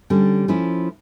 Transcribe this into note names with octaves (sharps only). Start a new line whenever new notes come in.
D3 G3 C#4
F3 C#4 E4